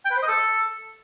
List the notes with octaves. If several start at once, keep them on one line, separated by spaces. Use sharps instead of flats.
G5
B4
C5
D#5
A4